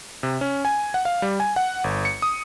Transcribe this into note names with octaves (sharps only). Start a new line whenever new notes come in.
C3
C#4
G#5
F#5
F5
G3
G#5
F#5
G1
C#7
D#6